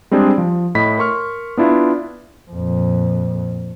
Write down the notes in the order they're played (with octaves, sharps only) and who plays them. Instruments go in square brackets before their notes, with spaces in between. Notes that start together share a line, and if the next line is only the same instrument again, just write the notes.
[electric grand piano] G3 G#3 C4 D4 G4 G#4
F3
A2 D#5 B5 B6
A#4 C6 C#6 F6
B3 D4 E4 F4
[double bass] F2 A#2